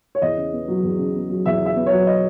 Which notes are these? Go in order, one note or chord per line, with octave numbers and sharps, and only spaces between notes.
C#5
E2 D#5
C#3
B3
F#3
E2
C#3
B3
F#3
E2 E5
C#3
E5
B3
C#5
F#3
D#5